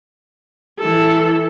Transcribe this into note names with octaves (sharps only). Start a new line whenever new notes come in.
E3 A4